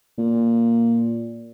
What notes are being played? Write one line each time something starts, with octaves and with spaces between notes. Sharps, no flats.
A#2